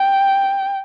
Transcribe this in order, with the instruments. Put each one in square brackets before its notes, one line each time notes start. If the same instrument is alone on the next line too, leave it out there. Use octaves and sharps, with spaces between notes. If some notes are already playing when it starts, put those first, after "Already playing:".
Already playing: [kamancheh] G5